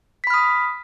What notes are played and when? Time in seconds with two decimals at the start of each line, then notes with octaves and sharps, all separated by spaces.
0.24 B6
0.27 B5
0.30 F6
0.34 D#6